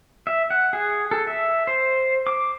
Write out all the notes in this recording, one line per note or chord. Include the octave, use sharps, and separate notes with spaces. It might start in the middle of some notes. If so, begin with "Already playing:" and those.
E5
F#5
G#4
A4
E5
C5
D6